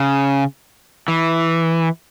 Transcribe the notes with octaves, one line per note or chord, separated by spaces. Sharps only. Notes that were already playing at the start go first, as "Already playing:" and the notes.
Already playing: C#3
E3